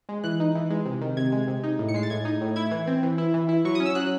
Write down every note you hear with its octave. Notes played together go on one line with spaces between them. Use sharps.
G#3
E3 F#6
D#4
E3
G#3
C3
D#3
C3 G#6
G#3
C3
D#4
A2
C#7
G#3 C7
A6
A2 G#6
D#4
A2
E4 G#6
E3
C4
E3
E4
E3
E4
F#3 C#6
C#4 D#6
E6
F#3 F#6